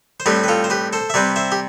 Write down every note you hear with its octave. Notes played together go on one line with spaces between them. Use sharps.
C5
A2 G3 C4 G4 B4
B4
F4 A4
C5
G4 B4
A4 C5
E5
C3 G3 C4 B4 D5
C5 E5
G4